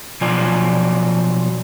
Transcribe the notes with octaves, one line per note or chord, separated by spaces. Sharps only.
B2 F3 F#3 F4 D5 G#5